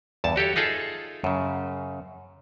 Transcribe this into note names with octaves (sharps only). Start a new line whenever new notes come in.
E2 G2 A5
F#4 G4 A4 C#5
D#4 F4 G#4 A4 E5 F5
F#2 C#3